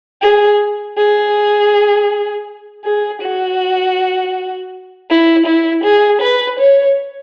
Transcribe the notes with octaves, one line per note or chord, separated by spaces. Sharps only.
G#4
G#4
G#4
F#4
E4
E4
G#4
B4
C#5